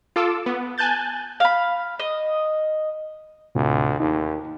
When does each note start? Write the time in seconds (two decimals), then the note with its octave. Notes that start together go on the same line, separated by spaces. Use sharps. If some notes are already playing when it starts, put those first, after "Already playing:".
0.16 F4 A4 D6 E6
0.46 B3
0.78 G#5 A5 F#6 G6 A6
1.40 F5 B5
1.99 D#5
3.55 D2 A2 C3 F4
4.00 D#2 D#4